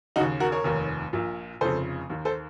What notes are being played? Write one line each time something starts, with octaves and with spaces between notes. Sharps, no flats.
D#2 C#3 D#4 F#4
F#4 A#4
A#4 C#5
F1 D#2 D#3
A#1 A#2
F1 F2 C#3 A4 C5
D#2 D#3
A4 C5